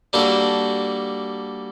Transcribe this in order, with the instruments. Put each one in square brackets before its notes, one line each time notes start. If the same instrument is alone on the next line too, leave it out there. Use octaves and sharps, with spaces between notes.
[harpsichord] G3 A#3 D4 F#4 A4